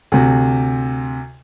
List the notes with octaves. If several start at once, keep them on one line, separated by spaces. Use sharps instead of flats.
D2 C3